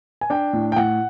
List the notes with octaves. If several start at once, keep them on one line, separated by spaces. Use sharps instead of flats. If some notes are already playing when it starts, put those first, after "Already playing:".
G#5
D4 G5
A2
G5
A2 F#5